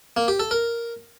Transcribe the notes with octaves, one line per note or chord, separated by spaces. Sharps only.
A#3
G4
A4
A#4